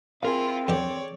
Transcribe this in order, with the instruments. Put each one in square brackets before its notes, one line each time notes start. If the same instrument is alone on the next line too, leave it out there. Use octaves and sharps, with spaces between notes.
[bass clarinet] C4 [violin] E4 F4 [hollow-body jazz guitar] G#4 A#4 F5
[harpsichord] E2 D3 G4 [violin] C#5 D5